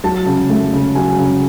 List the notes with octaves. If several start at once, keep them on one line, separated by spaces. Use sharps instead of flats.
F#3 A5
C#3
A3
C#3
F#3 G#5
C#3